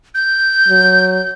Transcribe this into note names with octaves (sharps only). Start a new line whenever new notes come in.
G6
F#3